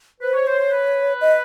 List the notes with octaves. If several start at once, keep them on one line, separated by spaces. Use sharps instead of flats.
B4 C5
C#5
C5 C#5
C5
B4
D#5